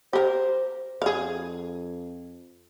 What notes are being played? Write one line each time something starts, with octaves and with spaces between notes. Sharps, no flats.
G4 A#4 C5
F2 G#4 F5